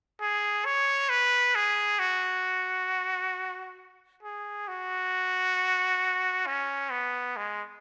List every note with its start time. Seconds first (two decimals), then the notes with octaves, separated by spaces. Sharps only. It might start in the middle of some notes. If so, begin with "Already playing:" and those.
0.21 G#4
0.65 C#5
1.10 B4
1.55 G#4
1.99 F#4
4.23 G#4
4.68 F#4
6.46 C#4
6.91 B3
7.37 G#3